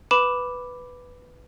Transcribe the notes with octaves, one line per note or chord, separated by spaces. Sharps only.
B4 B5 D6 E7